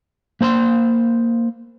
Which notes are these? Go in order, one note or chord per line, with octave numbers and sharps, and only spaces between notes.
A#3 C5 B5 C6